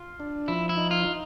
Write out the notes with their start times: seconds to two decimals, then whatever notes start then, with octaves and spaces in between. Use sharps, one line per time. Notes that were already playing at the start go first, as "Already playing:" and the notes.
Already playing: F4
0.20 D4
0.48 F3 E4
0.69 E4
0.77 D#4
0.91 F4
1.05 D#4